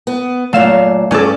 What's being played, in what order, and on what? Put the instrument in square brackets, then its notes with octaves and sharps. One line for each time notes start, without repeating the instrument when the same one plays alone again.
[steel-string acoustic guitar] B3
[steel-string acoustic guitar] F#2 A#2 [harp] A3 F5 E7
[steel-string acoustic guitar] G2 D5 [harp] C#4 A4